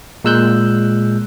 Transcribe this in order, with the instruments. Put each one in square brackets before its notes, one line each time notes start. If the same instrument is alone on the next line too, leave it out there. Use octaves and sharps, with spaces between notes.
[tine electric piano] A#2 G#3 E6 F#6 G6